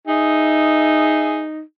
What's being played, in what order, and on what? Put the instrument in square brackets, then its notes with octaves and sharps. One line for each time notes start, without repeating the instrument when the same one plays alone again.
[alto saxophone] D#4 [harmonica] G#4 E5